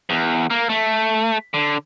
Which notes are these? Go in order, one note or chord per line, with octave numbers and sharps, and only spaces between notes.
E2
A#3
A3
D3